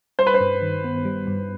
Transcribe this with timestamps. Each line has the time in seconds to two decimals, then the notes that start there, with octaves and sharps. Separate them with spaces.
0.19 G3 C5
0.27 B4
0.34 C5
0.40 G2
0.62 D#3
0.84 B3
1.05 G3
1.27 G2